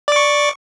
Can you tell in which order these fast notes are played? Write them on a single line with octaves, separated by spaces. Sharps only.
D5 D6 C#6